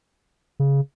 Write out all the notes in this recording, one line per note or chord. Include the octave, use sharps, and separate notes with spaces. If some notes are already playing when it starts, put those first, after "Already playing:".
C#3